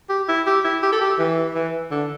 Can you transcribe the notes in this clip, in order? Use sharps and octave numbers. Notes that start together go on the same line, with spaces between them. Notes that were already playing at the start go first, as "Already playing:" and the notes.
G4
E4
G4
E4
G4
A4
G4
E3
E3
D3